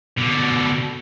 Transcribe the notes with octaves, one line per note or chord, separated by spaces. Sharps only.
B2 D3